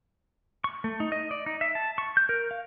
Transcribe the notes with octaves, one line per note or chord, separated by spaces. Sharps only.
C#6
A3
D#4
D#5
D5
D#4
E5
A5
C#6
G6
A#4
F5